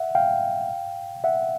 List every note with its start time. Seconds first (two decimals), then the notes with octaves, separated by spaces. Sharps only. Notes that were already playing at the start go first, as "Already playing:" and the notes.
Already playing: E5 F#5
0.15 F5 G5
1.24 E5 F#5